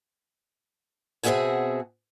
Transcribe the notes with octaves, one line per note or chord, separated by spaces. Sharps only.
B2 C4 G#4 E5 F#5 G#5